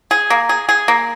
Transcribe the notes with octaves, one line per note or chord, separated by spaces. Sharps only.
G#4
A#3
G#4
G#4
A#3